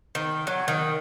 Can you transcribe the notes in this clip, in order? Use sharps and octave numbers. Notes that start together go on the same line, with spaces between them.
D#3
F#3
D#3